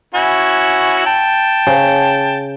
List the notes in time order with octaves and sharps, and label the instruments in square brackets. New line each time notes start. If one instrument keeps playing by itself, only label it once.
[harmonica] C#4 E4 F#4
G5 A5
[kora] C#3